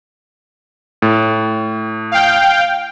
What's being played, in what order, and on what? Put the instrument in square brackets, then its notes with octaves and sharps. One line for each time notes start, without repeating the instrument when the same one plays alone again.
[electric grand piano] A2
[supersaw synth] F5 G5